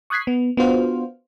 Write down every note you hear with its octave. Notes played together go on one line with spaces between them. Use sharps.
C#6 D#6 F#6 G#6 B6 C7
B3
B3 D4 F4 F#4 C5 F5